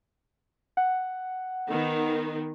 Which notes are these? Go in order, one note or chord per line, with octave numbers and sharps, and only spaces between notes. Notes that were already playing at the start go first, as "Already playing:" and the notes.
F#5
D#3 B3